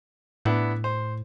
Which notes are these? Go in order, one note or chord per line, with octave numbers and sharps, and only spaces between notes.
A2 B3 D4 E4
C5